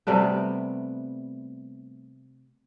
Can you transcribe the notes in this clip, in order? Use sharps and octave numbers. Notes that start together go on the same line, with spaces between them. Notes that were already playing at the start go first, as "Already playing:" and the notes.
C3 G3 A3 B3